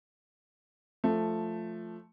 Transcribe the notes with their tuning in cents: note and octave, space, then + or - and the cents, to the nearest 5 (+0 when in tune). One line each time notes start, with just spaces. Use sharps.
F3 +0 A3 +0